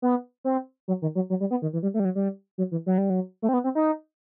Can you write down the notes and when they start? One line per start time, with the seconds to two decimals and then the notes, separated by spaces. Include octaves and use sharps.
0.02 B3
0.44 C4
0.88 F#3
1.02 D#3
1.15 F#3
1.30 F#3
1.40 G3
1.51 B3
1.62 D#3
1.73 E3
1.83 G3
1.94 A3
2.00 G3
2.05 F#3
2.15 G3
2.58 F#3
2.72 E3
2.86 F#3
2.98 G3
3.10 F#3
3.42 A3
3.49 C4
3.53 B3
3.64 C4
3.75 D#4